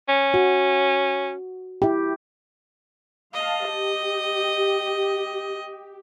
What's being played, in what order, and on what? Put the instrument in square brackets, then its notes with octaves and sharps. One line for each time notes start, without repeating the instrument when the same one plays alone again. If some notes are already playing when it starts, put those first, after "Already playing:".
[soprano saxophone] C#4
[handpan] F#4
E4 G4
[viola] D#5 [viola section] F5 A5
[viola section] G4